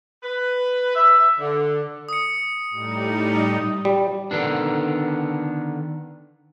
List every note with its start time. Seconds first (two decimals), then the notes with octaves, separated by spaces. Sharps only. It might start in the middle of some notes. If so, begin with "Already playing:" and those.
0.23 B4
0.95 E5
1.39 D3
2.09 D#6 C#7
2.70 A2 G3 D#4
3.85 G3
4.31 D3 D#3 B3 D4